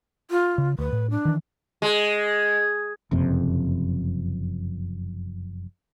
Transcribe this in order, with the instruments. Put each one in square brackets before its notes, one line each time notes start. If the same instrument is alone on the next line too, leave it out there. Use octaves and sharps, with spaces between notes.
[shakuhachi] F4
[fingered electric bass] C#3
[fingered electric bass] D2 [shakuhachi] B4
[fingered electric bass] A2
[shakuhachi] D4
[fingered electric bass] D#3 E3
[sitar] G#3
[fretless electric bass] F#1 F2 C3